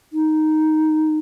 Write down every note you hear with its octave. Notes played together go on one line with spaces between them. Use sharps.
D#4